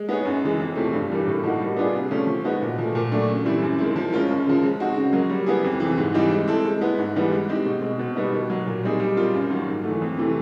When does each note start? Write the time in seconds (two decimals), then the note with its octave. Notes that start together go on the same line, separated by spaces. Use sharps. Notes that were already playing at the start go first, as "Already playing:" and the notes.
Already playing: G#3
0.09 B3 D#4 G#4 C#5
0.25 F#2
0.43 C#3 E3 G#3
0.59 F2
0.76 C3 F3 A3
0.93 G2
1.10 E3 G3 A#3
1.27 A2
1.43 F3 A#3 D#4 F#4
1.60 G3
1.77 B3 D4 F4 G#4
1.94 C3
2.10 F3 A3 C#4
2.27 F3
2.44 G#3 B3 D#4 F#4
2.62 A#2
2.79 F3 A3
2.95 A#2
3.12 F#3 A3 D4
3.28 C#3
3.45 E3 G3 C4 E4
3.62 F#2
3.78 D#3 G#3 C4 E4
3.96 F3
4.12 G#3 C#4 F4 A#4
4.30 F#2
4.46 C#3 F3
4.63 G#3
4.80 C4 D#4 F#4
4.96 C#3
5.13 F#3 A#3
5.30 G3
5.46 B3 E4 G#4
5.64 F2
5.80 C3 E3
5.97 G#2
6.14 E3 G3 C4 D#4
6.32 G#3
6.48 C4 E4 A4
6.64 G#3
6.81 B3 E4
6.98 G#2
7.15 E3 G3 B3
7.32 G#3
7.49 C4 D#4 G4
7.66 B2
7.82 G#3 C4
7.99 B2
8.15 G3 B3 D#4
8.33 D#3
8.50 F#3 A#3
8.66 A#2
8.83 G3 C4 D#4 G#4
9.00 G3
9.16 C4 F4 A#4
9.33 F#2
9.50 D#3 F#3 A#3
9.68 G#2
9.84 E3 A3
10.02 F2
10.17 C3 E3 A3